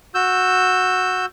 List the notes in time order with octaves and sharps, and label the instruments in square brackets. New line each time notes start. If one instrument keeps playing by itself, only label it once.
[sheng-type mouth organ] F#4 E6 G6